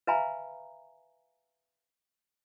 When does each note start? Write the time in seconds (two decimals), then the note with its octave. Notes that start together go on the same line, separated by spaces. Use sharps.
0.07 B4 E5 F5 G#5 A#5 B5